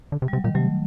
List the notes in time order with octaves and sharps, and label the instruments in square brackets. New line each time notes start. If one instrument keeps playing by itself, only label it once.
[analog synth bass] D3
C3
[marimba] G3
[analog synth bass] C3 [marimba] F#3
[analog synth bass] A#2 [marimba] D#3 G3
[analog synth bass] C3 [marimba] F#3 A3